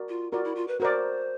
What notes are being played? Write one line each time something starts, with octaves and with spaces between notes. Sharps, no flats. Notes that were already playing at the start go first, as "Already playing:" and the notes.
Already playing: F#4 A#4 D5
F4
F4 F#4 A#4 D5
E4
F4
B4
F#4 A#4 C5 D5